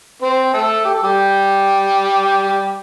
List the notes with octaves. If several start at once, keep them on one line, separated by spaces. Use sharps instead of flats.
C4 C5
A3 A4
G4
A4
G3 G4